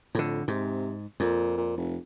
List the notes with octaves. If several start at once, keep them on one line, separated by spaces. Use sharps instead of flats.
F2 A2 D3
G#2 C3
F2 A#2
A#2
F1